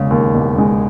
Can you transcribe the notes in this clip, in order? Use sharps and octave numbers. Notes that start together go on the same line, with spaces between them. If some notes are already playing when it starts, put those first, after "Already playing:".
Already playing: E1 C#3 G#3
D#2
E1
G#3